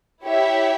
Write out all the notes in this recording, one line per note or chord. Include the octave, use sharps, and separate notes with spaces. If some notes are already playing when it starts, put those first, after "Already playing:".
E4 G4 C#5 E5